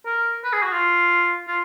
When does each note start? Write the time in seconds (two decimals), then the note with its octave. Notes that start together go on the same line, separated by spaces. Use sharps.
0.06 A#4
0.44 B4
0.53 G#4
0.62 F#4
0.72 F4
1.48 F4